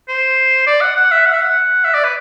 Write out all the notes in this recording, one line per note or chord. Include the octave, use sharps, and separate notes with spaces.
C5
D5
F#5
F#5
E5
F#5
E5
F#5
E5
D5
B4